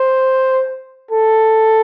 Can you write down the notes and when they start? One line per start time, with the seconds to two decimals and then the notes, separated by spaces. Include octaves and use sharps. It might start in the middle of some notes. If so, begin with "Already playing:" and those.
Already playing: C5
1.11 A4